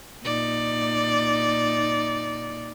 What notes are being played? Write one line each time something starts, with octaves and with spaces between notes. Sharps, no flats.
A#2 D#4 D5